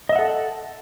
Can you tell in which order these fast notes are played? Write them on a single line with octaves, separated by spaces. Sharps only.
D#5 E5 F#5 A4